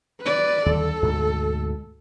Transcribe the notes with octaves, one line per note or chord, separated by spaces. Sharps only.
B4 D5
D#2 D3 G3 A4
D2 G#2 B2